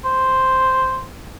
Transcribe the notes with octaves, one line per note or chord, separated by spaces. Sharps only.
C5